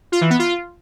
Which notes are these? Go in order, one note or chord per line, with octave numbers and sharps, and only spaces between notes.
F4
E3
B3
F4